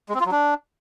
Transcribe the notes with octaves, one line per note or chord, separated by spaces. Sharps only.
G#3
C4
F4
F#3
D4